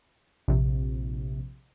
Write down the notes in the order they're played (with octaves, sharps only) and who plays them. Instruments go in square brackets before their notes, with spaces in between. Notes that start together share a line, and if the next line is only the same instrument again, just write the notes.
[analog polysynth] A#1 C3